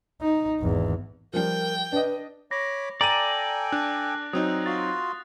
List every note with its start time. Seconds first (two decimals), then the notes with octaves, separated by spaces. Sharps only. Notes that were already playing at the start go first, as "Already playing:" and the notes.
0.21 D#4
0.60 G#1 E2
1.33 F3 G3 A#4 G5
1.92 D4 B4 D#5
2.51 C#5 B5 D6 A#6
3.01 A4 D5 G5 G#5 A#5 A6 D#7
3.72 D4 F#6
4.33 F#3 C4 D#4 D#6
4.66 F4 F#4 C6 A6